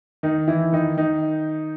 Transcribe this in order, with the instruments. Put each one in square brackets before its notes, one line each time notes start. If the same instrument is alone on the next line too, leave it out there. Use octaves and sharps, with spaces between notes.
[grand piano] D#3 D#4
E3 E4
D#3 D#4
D#3 D#4